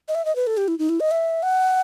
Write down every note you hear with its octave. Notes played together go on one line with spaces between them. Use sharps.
D#5
E5
D#5
B4
A4
G4
E4
D#4
E4
D#5
E5
F#5